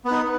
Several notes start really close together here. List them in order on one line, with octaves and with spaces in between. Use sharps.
B3 B4 D#4